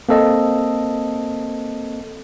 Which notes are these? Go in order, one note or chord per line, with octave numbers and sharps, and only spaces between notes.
A#3 C4 A4 D#5